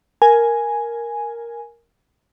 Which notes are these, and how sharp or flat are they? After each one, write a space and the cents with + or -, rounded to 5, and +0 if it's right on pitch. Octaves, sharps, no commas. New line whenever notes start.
A#4 +0 G#5 +0